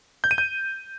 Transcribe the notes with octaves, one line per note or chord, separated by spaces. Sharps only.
G6
D#7
G6